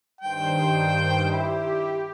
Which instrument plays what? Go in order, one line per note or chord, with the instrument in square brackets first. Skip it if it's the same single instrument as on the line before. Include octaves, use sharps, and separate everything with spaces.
[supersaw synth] G2 D#3 C5 [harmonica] G5
[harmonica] E4 [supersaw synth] G4